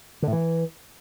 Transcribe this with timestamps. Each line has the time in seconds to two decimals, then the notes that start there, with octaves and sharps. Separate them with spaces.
0.22 D3
0.27 A2
0.33 E3